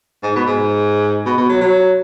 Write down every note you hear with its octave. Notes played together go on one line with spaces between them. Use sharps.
G#2
B2
G#2
B2
B2
F#3
F#3